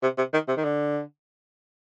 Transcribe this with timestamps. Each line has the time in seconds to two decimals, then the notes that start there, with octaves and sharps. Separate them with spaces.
0.03 C3
0.18 C3
0.33 D#3
0.48 C3
0.57 D#3
0.64 D3